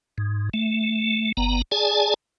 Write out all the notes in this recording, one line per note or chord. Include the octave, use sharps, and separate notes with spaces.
G#2
A3
G1 B3 A#5
G#4 D5 G#5 A5